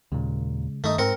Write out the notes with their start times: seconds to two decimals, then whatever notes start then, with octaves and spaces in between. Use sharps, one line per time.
0.12 D#2 A#2 C#3 G#3
0.84 G2 D#3 A3 D#4
0.98 G#2 C4 A#4 C#7